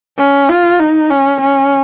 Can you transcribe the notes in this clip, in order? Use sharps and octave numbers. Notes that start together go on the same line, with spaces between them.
C#4
F4
D#4
C#4
C#4